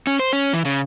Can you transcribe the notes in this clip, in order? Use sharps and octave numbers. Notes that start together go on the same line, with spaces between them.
C#4
C5
C#4
E3
C#3